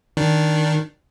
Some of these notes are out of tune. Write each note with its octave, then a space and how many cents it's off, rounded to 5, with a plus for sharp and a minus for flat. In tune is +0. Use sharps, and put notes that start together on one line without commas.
D#3 +0 D4 +0